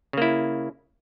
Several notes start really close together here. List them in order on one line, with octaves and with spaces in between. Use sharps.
C#3 A#3 E4